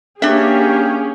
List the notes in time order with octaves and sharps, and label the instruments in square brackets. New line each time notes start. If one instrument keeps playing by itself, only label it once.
[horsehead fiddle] A#3 G5 [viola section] C#4 G#4 [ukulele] D4 E5 [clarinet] G4